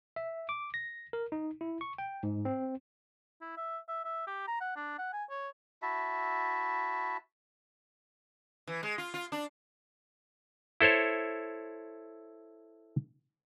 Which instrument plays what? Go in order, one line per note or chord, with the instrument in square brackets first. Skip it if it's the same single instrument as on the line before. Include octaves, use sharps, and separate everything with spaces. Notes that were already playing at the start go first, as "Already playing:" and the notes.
[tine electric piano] E5
D6
A#6
A#4
D#4
E4
C#6
G5
G#2
C4
[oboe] E4
E5
E5
E5
G4
A#5
F#5
D4
F#5
G#5
C#5
[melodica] E4 F#4 E5 A5
[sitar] E3
G#3
F4
F4
D4
[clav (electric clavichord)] E4 A4 C5 C#5